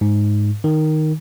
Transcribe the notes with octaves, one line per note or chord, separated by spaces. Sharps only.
G#2
D#3